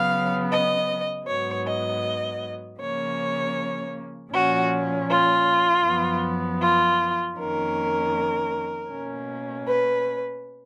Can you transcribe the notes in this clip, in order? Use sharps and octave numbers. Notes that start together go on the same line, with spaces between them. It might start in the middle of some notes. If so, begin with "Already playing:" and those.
Already playing: C#3 F#3 B3 F5
D#5
G#2 F#3 B3 C#5
D#5
C#3 F3 A#3 C#4 C#5
A#2 F3 A#3 C#4 F#4
F4
F#2 F3 B3
F4
F2 D#3 A#3 C#4 A#4
B2 A#3 C#4
B4